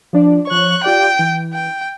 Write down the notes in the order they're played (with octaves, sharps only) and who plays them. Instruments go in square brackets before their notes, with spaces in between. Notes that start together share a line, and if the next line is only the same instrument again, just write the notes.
[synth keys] F3 D4 D5
[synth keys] F3 C#5 [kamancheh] C#6 F#6
[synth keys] F4 G4 D5 [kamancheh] G5
[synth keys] E3
[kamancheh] G5